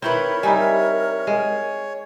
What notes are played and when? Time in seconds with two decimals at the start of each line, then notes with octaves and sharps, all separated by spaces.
0.02 D#3 C4 E4 A#4 B4 C#5
0.43 G3 D#4 E4 E5 G#5
1.27 G#3